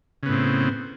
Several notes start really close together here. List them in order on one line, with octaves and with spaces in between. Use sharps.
C#3 B3 A2 C4